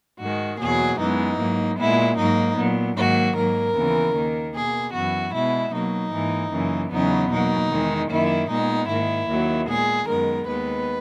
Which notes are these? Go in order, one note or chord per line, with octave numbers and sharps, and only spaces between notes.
G#2 D#3 G#3 F#4
E2 B2 F#3 A#3 G#4
F#2 E3 G#3 B3 D#4
G#2 F#3 A#3
A#2 G#3 B3 E4
G#2 F#3 A#3 D#4
A#2 F#3 B3
G#2 D#3 F#3 A#3 F#4
G#2 F#3 A#3 A#4
D#2 C#3 E3 B3
D#2 D#3 A#3
B2 A#3 G#4
F#2 E3 B3 F#4
B2 G#3 B3 E4
B2 F#3 A#3 D#4
G#2 E3 A#3
F#2 C#3 E3 A#3
E2 C#3 F#3 B3 D#4
B2 F#3 A#3 D#4
E2 D#3 G#3
F#2 D#3 A#3 E4
A#2 G#3 B3 D#4
G#2 D#3 A#3 E4
D#2 D#3 F#3 A#3
A#2 G#3 B3 G#4
F#2 D#3 G#3 B3 A#4
D#2 D#3 G#3 B3 B4